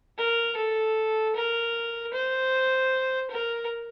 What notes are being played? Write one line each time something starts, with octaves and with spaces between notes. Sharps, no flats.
A#4
A4
A#4
C5
A#4